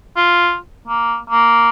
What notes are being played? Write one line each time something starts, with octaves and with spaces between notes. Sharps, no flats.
F4
A#3
A#3